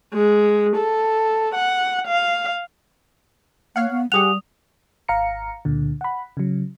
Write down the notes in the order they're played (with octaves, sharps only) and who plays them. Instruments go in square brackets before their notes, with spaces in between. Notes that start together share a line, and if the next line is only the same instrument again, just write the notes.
[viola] G#3
A4
F#5
F5
[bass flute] A#3 [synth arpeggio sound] C#5 F5 F#5
[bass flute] B3
[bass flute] G3 [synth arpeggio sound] G4 G#4 F#5 [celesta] D#6 F7
[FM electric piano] G#1 F5 A#5 C#7
C#2 A#2 D3
F#5 B5
C#3 F#3